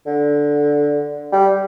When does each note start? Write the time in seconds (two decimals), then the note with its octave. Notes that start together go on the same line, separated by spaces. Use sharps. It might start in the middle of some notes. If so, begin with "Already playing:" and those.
0.06 D3
1.33 G3